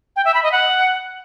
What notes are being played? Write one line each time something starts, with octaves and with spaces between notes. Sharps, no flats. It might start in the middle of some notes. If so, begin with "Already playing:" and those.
G5
E5
B5
D#5
F#5